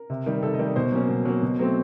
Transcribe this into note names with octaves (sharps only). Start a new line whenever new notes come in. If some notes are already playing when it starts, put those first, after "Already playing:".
Already playing: A#4
C3
D#3 G3
C3 A4
D#5
D#3 G3
B2 C5
F#3 A#3 C#4
B2
F#3 A#3 C#4
B2
F#3 A3 C4